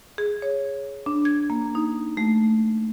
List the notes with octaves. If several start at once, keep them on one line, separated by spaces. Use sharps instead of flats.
G#4
C#5
D4
G#6
A#3
D#4
A3